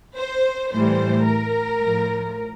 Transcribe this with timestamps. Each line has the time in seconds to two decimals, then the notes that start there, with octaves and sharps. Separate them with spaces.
0.17 C5
0.72 A2 E3 G3 C5
1.26 A#4
1.81 A2 F3